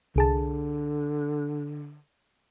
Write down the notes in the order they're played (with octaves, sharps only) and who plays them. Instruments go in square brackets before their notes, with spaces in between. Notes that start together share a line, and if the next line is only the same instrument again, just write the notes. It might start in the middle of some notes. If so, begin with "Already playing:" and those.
[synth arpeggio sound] C2 G#4 A5 [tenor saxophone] D3